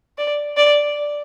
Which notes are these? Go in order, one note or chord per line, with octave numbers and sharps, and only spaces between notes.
D5
D5